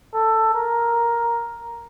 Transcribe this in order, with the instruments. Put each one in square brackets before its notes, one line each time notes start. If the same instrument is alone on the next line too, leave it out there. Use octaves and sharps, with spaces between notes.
[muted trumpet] A4
A#4